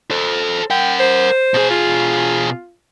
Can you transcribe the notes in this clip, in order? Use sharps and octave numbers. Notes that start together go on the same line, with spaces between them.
A4 C5
A#4 F#5 G5
C5
B2 G#4
F4